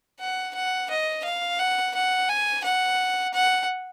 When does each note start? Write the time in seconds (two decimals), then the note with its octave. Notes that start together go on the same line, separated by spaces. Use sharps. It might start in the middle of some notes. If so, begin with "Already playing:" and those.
0.20 F#5
0.55 F#5
0.90 D#5
1.24 F5
1.59 F#5
1.95 F#5
2.29 G#5
2.64 F#5
3.33 F#5